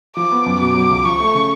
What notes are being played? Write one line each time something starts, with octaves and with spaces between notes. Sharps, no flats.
F3 D6
B3
F#2
B2 D6
F#3
C#2
F3 C#6
A3
C#3